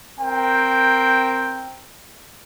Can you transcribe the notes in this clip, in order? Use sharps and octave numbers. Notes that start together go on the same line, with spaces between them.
C4 A#4 G5